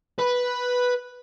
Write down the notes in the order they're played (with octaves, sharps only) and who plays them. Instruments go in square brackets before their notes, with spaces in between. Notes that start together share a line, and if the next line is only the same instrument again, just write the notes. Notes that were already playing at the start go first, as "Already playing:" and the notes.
[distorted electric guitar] B4